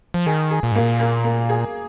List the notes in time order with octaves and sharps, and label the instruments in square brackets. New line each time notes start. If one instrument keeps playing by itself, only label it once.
[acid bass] F3
[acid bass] D#3 [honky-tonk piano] G#4
[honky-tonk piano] G#4
[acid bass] A#2
[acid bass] G#2 [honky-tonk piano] A#3
[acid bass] A#2
[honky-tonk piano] A#3
A#3
G#4